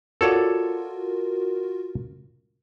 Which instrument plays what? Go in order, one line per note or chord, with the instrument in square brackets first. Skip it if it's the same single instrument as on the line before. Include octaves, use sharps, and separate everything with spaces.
[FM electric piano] F4 F#4 A#4 [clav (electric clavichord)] A4 C#5 D5